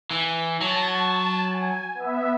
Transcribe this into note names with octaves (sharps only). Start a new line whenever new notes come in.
E3
F#3 A5
G#5
B3 E5